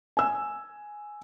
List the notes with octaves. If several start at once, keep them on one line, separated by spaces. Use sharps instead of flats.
G#5 E6